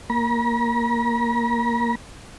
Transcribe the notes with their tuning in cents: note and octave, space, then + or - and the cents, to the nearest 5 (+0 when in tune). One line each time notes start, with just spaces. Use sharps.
A#3 +0 A#5 +45